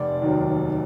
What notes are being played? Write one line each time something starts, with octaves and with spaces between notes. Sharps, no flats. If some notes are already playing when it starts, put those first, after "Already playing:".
Already playing: F1 D5
D#2 D#3 F#3